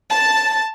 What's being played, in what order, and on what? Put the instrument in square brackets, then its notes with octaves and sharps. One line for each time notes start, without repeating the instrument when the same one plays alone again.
[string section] A5